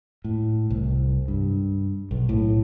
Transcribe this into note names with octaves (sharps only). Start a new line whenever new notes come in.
A2
C2
G2
B1
A2